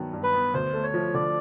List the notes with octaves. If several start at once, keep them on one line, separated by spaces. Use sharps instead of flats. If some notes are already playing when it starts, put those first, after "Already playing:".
Already playing: G2 D#3 F#3 B3
G2
B4
B3
D2 C5
A3
C#5
F3
D3 D5